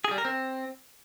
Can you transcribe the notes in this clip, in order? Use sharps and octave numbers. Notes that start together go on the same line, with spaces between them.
G#4
G3
A#4
C4